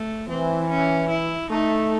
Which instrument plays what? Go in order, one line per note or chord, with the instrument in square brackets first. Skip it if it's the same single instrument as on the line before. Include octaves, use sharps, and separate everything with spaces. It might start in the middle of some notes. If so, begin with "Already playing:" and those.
Already playing: [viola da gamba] A3
[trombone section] E3 [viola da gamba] C4
[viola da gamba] C#4
E4
[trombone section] A3 [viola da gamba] D#4